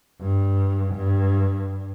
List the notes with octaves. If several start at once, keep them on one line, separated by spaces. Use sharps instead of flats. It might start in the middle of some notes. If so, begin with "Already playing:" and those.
G2
G2